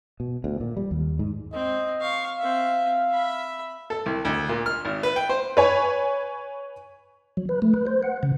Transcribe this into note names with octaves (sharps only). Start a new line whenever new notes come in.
B2
D2
A#2
G3
D#2
G#2
C4 D#5
F5 C#6
C4 E5 F5
E5 B5
A4
C2
D2
A#2
F6
G#1
B4
G5
C5
B4 C#5 G#5
F#3
B4
A3
B4
C5
F#5
C#3